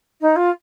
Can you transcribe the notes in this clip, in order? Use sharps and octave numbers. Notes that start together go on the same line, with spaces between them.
D#4
F4